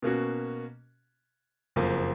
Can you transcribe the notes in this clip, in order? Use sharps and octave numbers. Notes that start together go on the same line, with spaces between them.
B2 A#3 C#4 F#4
F#1 F2 F3 A#3